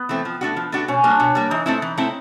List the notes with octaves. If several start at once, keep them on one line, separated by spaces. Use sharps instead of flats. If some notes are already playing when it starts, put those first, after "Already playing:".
Already playing: B3
E3 A3 C4
F3
A3 D4 F#4
F3
A3 D4 F#4
B2 C#4
G3 A#3 D4
B2
G3 A#3
E3 D#4
A3 C4 E4
E3
A3 C4 E4